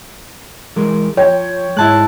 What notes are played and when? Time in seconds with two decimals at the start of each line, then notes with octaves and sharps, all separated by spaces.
0.76 E3 G#3 A#4
1.17 F3 C#5 G5
1.77 G#2 G#3 E4 A5 F#6